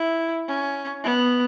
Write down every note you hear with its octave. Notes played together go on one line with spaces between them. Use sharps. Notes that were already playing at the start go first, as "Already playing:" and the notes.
Already playing: E4
C#4
B3